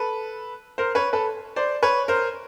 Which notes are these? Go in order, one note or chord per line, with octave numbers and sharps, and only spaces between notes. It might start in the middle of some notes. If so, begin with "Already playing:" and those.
Already playing: A4 B4
A#4 C5
B4 C#5
A4 B4
C5 D5
B4 C#5
A#4 C5